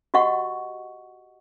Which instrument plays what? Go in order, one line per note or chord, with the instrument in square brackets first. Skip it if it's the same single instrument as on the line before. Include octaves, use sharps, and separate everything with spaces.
[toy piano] F#4 G4 D#5 F#5 C#6